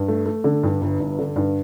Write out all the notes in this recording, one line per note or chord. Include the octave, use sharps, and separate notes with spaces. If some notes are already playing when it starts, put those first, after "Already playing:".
Already playing: G2
A3
A3
D3
G2
G1
G2
D3
G2